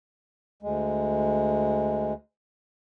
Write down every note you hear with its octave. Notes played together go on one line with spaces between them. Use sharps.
D2 G#3